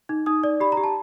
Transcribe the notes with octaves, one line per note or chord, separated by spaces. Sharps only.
D#4
D#4 D#6
D5
G4 B5
A#5
G4
A5